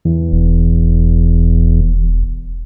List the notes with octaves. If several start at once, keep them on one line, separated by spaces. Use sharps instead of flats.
E2
E1